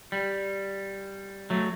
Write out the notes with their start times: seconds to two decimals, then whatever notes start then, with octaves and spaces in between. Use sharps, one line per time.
0.12 G3
1.50 F#3 A3